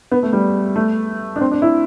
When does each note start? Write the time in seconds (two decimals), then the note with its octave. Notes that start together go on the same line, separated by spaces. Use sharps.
0.12 B3
0.23 A3
0.33 G3
0.76 A3
1.36 D4
1.41 C4
1.51 D4
1.62 E4